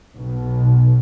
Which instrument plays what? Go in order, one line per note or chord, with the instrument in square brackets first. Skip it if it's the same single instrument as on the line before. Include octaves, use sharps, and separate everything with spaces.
[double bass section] B1